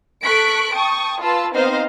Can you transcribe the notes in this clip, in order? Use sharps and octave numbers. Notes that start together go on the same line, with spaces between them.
A4 C#6 F#6 B6 D7
G5 A5 C#6 D#6
F4 B4 A5 E6
B3 C4 D#4 C5 D#5 F5